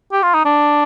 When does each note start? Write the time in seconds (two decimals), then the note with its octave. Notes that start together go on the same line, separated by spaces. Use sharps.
0.12 G4
0.23 F4
0.34 D#4
0.45 D4